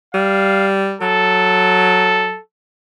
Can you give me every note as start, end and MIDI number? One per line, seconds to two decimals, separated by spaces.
0.14 0.96 55
0.14 0.69 77
1.01 2.35 54
1.01 2.41 69